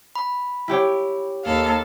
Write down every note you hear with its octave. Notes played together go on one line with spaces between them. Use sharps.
B5
E4 G4 C#5
D#2 A4 F5